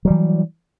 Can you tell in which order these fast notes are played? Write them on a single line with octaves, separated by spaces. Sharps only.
F#3 G3 E3